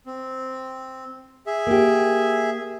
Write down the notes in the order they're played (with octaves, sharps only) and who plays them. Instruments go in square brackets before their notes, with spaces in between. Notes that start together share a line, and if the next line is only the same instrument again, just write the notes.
[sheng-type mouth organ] C4
G#4 E5
[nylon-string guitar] A#3 G4